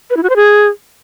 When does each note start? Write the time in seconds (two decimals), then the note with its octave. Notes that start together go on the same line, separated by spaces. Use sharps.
0.10 B4
0.17 E4
0.23 F#4
0.30 C5
0.36 G#4